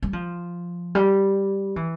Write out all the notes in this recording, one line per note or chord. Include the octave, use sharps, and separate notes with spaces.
G3
F3
G3
E3